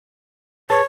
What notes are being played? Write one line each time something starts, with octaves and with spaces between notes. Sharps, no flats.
G#4 B4 C#5 A5